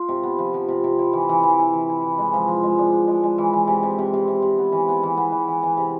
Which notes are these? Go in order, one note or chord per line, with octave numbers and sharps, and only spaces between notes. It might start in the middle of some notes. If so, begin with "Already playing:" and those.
Already playing: F4
C3
B3
F3
F3
C3
C3
E4
E3
E3
E3
E4
E3
E4
E3
G#3
F3
F3
G#3
D4
D4
G#3
G#3
E3
E3
C3
C3
C3
C3
C3
C3
B3
E3
B3
E3
B3
E3
E3
E3
C3